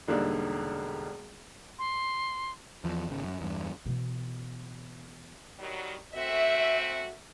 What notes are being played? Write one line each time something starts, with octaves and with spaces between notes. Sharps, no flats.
E1 D3 G3 A#3 D4 D#4
C6
E2 F3
G#1 C#3
F#2
E2 G2
B2 E3
D#3 F#3 G3
A3 C4 F#4 E5